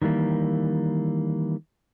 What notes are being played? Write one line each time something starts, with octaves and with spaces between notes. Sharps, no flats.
D#3 E3 G3 A#3